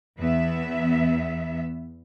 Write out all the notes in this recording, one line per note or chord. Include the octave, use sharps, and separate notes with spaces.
E2 B3 E5